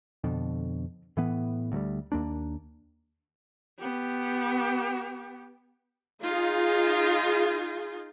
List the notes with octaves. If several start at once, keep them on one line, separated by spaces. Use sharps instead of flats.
F2 B2 D3
A2 E3 B3
D2 F#3 G3
D#2 A#3 D4
B3 G4
D#4 F4 G#4